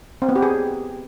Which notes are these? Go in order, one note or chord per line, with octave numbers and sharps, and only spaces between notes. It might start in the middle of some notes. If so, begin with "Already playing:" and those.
C4
B3
G4
G#4